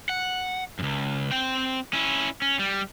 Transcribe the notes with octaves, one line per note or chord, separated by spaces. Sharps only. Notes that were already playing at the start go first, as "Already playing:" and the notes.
F#5
C#2 F#2
C4 G5
C#4 E4
C#4
G3